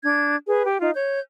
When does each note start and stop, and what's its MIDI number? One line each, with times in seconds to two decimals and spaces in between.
0.03 0.36 62
0.03 0.36 92
0.47 0.65 68
0.47 0.65 71
0.66 0.80 67
0.80 0.90 63
0.80 0.90 65
0.80 0.90 77
0.95 1.20 73
0.95 1.20 91